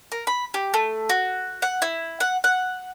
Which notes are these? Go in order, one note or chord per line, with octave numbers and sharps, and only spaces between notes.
A#4
B5
G4
A3
F#4
F#5
E4
F#5
F#5